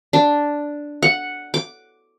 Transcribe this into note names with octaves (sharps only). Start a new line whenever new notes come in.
D4
F#5
D6